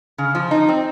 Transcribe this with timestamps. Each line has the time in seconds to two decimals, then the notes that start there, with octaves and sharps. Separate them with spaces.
0.18 C#3
0.35 F3
0.51 D#4
0.69 C4